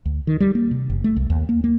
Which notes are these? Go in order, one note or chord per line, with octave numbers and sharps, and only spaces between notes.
D2
D#3
G3
A#3
C3
F#1
A3
C2
D#2
A#3
A#3